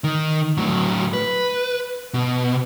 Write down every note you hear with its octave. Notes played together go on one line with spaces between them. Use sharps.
D#3
A2 F#3
B4
B2